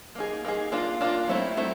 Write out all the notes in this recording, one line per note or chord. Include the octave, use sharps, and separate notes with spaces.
A#3 D#4 G#4
A#3 D#4 G#4
A#3 D4 F4
A#3 D4 F4
F#3 A3 C4 E4
F#3 A3 C4 E4